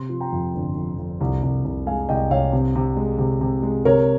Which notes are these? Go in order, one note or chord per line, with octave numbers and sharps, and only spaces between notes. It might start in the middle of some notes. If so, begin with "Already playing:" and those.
Already playing: C3 C6
F3
G5 A#5
F2
G1
F2
F2
C2
C2
C2
G#3 F5 G#5
C2 D#5 G5
C2 C#5 F5
C3
C3
G#3
C3
C3
G#3
C3 A#4 C#5